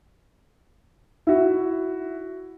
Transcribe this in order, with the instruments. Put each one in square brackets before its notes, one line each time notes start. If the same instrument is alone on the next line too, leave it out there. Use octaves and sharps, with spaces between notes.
[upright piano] E4 F#4